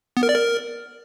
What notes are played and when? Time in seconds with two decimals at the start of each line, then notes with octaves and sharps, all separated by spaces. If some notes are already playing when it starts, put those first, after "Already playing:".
0.17 B3
0.23 A#4
0.29 D5
0.35 A#4